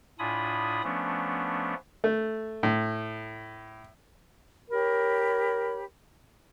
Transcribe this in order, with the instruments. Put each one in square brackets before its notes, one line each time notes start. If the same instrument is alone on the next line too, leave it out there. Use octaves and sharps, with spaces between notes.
[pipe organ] A2 D4 F4 G#5 B5 D#6
F3 A3 B3 C#4 D4
[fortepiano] A3
A2
[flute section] G4 C#5 B5 [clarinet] A#4